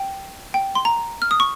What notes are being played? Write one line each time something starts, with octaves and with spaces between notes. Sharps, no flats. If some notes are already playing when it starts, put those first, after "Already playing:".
Already playing: G5
G5
C6
A#5
F6
D#6
C#6